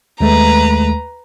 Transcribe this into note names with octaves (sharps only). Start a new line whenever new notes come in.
D#2 G#3 A3 B4 A#5